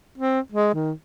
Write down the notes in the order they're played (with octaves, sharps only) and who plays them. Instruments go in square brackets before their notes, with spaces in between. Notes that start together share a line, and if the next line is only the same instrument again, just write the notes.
[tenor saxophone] C4
G#3
D#3